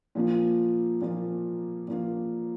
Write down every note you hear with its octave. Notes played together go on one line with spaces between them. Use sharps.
A#2 F3 A#3 F4
A#2 F3 A#3 F4
A#2 F3 A#3 F4